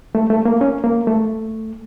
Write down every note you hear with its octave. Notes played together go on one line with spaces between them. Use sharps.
A3
A3
A#3
C#4
A#3
A3